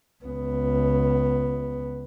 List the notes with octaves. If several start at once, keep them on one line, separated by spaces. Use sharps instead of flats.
C#2 B3